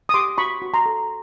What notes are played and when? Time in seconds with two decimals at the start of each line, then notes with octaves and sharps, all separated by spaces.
0.09 D#6
0.14 G4 C6 D6
0.38 F#4 B5 C#6
0.62 F#4
0.74 A#5 C6
0.86 A4